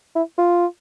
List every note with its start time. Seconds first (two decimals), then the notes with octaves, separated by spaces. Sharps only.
0.15 E4
0.38 F4